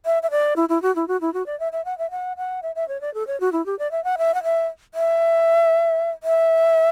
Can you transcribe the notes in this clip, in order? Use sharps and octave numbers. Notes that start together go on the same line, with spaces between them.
E5
E5
D5
E4
E4
F#4
E4
F#4
E4
F#4
D5
E5
E5
F#5
E5
F#5
F#5
E5
E5
C#5
D5
A4
C#5
F#4
E4
G4
D5
E5
F#5
E5
F#5
E5
E5
E5